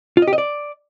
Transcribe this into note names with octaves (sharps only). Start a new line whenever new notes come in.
F4
D#5
G4
D#5
D5